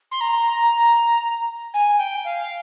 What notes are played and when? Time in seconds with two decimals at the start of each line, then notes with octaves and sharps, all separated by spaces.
0.11 C6
0.21 A#5
1.74 G#5
1.98 G5
2.25 F5